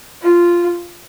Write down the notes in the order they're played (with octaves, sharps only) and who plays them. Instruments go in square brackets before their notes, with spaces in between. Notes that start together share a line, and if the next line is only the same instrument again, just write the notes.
[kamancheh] F4